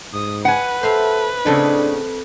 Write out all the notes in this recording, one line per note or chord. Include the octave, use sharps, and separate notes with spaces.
G#2 D#6
B4 F#5 G#5
A4 C5 E5 F5
A2 C#3 C4 D4 A4 D#5